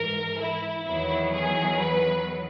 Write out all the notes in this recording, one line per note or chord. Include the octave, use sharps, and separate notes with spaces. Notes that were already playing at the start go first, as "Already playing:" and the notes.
Already playing: G#2 E3 A#4
E4
E2 D#3 F#3 E4
G#4
B4